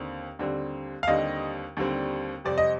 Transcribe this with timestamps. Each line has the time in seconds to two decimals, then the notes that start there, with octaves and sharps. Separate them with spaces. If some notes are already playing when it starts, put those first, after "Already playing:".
Already playing: D#2 D3 C4
0.39 D#2 D3 G3 C4
1.03 F5
1.07 D#2 D3 G3 C4 D#5
1.77 D#2 D3 G3 C4
2.44 F2 C3 G3 C4 D5
2.58 D#5